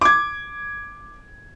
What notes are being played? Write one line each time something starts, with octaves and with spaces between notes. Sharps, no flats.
D6 G#6